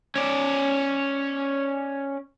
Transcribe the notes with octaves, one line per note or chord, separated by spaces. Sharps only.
C#4 D5